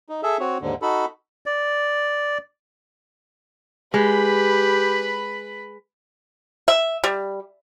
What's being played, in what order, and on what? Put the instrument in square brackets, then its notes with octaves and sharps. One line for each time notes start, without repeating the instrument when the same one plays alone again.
[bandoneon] D#4
G#4 A4 E5
C4 F#4 C#5
D#2 G#2 D3
D#4 F#4 A4 B5
[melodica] D5
[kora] G#3 [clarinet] G4 [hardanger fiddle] B4 B5
[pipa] E5
G3